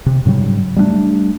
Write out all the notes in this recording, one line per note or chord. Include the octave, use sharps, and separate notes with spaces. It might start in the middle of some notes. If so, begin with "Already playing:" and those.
C3
G#2 C#3 F#3 G3
G3 A3 C4 D4